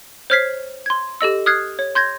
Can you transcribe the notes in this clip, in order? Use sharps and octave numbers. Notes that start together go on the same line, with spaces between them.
C5 C#5 F6 G#6 B6 C7
C6 G#6
G4 A4 D#5 E6
D#6 F6 F#6 G#6 C7
C#5
C6 G6 G#6 A#6